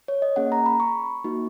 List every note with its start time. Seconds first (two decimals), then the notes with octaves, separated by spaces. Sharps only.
0.08 C#5
0.22 D#5
0.36 A#3 C#4 G#4 F#5
0.52 A#5
0.66 B5
0.80 C#6
1.24 A#3 D#4 F#4